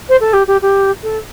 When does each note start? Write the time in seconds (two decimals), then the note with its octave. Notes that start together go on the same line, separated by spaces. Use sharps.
0.09 C5
0.20 A4
0.33 G4
0.47 G4
0.62 G4
1.03 A4